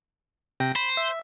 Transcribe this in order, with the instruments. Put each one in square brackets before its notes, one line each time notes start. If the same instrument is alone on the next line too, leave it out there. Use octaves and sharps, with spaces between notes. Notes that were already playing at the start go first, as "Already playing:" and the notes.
[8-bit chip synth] C3 G5 A#6
[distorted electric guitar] C5 [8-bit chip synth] B5
[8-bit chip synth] E5